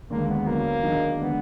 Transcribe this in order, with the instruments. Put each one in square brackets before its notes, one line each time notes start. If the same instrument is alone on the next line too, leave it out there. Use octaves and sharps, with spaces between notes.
[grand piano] D#2 D3 G#3 [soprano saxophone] A#3
[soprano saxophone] B3
[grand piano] D3 F#3 B3 [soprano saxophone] A#3
[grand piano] D#3 F#3 D4 G#4 D#5
[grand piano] D3 G#3 D4 [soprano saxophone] B3